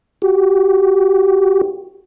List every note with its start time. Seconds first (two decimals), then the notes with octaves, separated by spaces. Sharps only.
0.22 F#4 G4